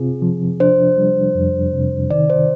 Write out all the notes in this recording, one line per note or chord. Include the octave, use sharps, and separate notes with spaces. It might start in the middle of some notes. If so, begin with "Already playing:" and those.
Already playing: C3 C4 F4 G#4
F3
D4 C5
G3
F2
C3
D#3 D5
C5